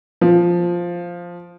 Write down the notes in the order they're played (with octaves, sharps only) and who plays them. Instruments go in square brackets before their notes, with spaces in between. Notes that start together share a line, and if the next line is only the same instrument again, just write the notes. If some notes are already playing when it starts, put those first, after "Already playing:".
[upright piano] F3